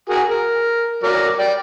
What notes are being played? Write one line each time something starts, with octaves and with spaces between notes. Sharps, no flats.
F#4 G#4 A#4
A#4
F#3 A#4 D5
D5 G5